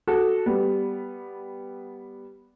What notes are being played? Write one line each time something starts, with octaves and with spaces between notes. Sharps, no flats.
F#4 A4
G3 B3